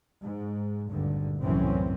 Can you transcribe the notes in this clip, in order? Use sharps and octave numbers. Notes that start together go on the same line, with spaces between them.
G#2
G#1 D2 G2 A#2 D3
C2 F#2 A2 E3 C4 C#4